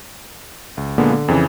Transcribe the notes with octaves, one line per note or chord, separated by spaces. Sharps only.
C#2
A#2 D3 G#3 A#3 B3
D3
F2 C#3 E3